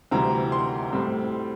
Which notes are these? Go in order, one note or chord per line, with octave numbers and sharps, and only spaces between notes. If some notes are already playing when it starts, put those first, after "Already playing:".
D2 C3 E3 G3 C4 A#5
C6
A2 G3 C4